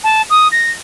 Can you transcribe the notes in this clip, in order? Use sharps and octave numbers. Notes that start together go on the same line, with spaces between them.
A5
D#6
A#6